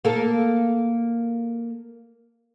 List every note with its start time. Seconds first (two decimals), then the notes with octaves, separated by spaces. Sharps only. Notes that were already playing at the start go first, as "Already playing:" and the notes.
0.05 A#3 A4